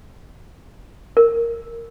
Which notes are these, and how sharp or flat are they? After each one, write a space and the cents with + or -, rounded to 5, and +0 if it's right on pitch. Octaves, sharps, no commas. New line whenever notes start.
A#4 -10